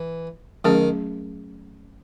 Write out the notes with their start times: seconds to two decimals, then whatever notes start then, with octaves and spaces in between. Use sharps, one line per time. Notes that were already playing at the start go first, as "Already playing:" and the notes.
Already playing: E3
0.64 D#3 F#3 A3 C#4 G#4